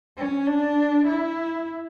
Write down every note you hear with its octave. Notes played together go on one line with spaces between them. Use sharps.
C#4
D4
E4